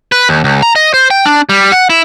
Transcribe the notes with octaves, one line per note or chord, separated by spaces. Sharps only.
B4
D#2
C#2
A#5
D#5
C5
G5
D4
G3
F#5
E4